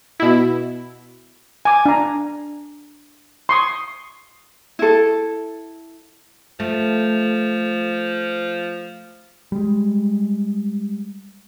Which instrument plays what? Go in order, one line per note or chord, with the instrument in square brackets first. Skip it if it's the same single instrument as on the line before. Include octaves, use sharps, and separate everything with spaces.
[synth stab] B2 E4
[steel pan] G#5 D6
D4 A#5
C6 C#6 D#6
[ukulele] E4 A4
[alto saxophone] F3 [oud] A3
[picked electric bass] G3 G#3